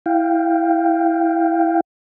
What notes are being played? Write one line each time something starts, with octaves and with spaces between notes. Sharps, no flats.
E4 F5 G5